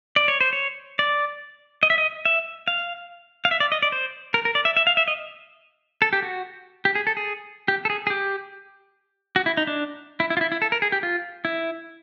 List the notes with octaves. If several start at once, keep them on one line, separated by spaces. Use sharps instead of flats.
D5
C#5
C5
C#5
D5
D#5
E5
D#5
E5
F5
F5
E5
D5
D#5
D5
C5
A#4
A#4
D5
E5
E5
F5
E5
D#5
A4
G4
F#4
G4
G#4
A4
G#4
G4
A4
G#4
G#4
G4
F#4
E4
D#4
D4
E4
E4
F4
E4
E4
A4
A#4
G#4
G4
F4
E4